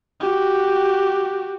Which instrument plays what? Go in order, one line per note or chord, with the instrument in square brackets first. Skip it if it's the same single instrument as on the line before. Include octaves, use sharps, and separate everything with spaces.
[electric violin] F#4 G4